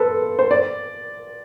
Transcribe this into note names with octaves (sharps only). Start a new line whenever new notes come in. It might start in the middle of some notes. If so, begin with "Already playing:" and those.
Already playing: A4 B4 C5
C5
D5